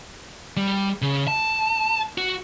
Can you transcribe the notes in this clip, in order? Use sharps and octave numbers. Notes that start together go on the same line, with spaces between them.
G3
C#3
A5
F#4